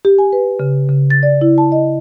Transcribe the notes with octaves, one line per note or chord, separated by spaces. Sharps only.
G4
G#5
B4
C#3
C#3
A6
D5
E4
A5
D#5